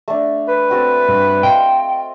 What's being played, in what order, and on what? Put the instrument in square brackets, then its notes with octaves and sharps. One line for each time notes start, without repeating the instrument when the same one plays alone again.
[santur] A3 D4
[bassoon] B4
[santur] C4 F#4 A4
[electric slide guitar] G2
[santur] D#5 F5 C6 [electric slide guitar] G5
[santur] C6